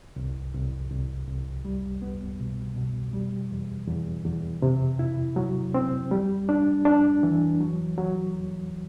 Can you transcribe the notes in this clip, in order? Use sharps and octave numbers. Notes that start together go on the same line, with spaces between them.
C2
C2
C2
C2
G3
B3
B2
B2
G3
E2
E2
E2
C3
E4
F#3
C4
G3
D4
D4
E3
F#3
F#3
E2